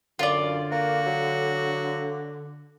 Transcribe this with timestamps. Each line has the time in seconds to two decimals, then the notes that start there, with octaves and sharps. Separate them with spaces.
0.19 F#2 D3 F4 D5
0.72 A#3 F#4
1.06 F#3